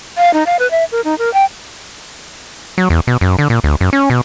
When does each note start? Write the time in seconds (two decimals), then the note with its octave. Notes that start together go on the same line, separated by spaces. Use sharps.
0.18 F5
0.34 D#4
0.46 F5
0.59 B4
0.71 E5
0.92 A#4
1.05 D#4
1.18 A#4
1.34 G5
2.78 F#3
2.90 E2
3.07 B2
3.21 F#2
3.39 D3
3.50 A#2
3.64 D2
3.81 F#2
3.93 C#4
4.10 B2